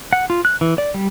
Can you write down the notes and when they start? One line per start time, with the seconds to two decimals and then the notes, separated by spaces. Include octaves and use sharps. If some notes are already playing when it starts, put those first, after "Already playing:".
0.13 F#5
0.30 F4
0.45 F#6
0.61 E3
0.78 D5
0.94 G3